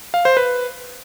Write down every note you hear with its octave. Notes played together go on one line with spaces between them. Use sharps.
F5
C5
B4